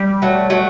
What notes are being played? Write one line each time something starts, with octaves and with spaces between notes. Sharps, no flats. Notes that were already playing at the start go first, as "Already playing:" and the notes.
Already playing: G3
F#3 A3
F#3 A3